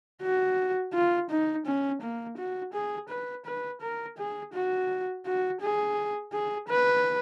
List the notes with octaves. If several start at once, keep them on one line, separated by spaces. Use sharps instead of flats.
F#4
F4
D#4
C#4
A#3
F#4
G#4
B4
B4
A#4
G#4
F#4
F#4
G#4
G#4
B4